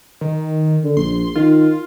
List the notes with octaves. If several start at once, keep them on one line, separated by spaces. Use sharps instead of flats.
D#3
D3
A#1 C6
D#3 F4